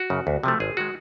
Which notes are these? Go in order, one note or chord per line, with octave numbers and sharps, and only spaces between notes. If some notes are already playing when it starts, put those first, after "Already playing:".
Already playing: F#4
F#2 C#3
D2
C3 F3 A3
G#1 G#4
D#3 G#3 F#4